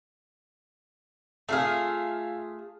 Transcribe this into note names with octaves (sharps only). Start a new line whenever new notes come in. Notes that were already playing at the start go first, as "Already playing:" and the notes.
A3 F4 G#4 E5 F5 F6